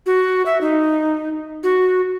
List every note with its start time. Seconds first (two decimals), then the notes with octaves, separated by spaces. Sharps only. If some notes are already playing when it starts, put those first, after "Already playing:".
0.06 F#4
0.46 E5
0.61 D#4
1.63 F#4